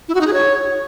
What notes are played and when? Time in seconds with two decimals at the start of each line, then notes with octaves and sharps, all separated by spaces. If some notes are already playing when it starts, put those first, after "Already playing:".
0.08 E4
0.15 F#4
0.21 D#4
0.27 G#4
0.33 C#5